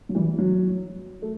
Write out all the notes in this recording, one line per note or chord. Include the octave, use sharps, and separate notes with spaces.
F#3
E3 G3
F#3
A3